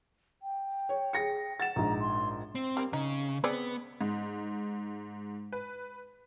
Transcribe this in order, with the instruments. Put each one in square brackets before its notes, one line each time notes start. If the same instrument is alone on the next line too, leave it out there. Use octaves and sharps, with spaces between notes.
[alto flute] G5
[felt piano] C#5
G#4 A#6 C#7
[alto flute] F#5 [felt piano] A6 E7
[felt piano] A#1 G#2 [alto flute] A#5
[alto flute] C6
[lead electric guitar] C4
[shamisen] G3 A#3
[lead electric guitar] C#3 [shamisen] D#4
[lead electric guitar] B3 [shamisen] C4 G#4 D5
[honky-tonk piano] G#2
B4